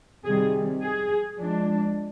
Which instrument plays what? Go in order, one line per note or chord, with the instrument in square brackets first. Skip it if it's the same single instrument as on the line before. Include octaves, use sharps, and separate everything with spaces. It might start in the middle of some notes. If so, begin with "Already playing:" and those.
[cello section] C3 D#3 G3 G#4
G#4
F3 G#3 D4